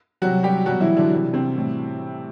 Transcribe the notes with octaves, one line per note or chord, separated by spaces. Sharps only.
C3 F#3 G3 F#4
G3 G4
B2 F#3 G3 F#4
E3 E4
D3 D4
C3 E3 G3
C3 C4
A2 E3 G3